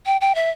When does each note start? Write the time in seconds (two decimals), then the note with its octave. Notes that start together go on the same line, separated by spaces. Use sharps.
0.06 G5
0.21 G5
0.35 E5